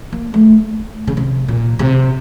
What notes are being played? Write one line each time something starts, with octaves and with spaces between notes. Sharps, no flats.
A#3
A3
C#3
C3
A#2
C3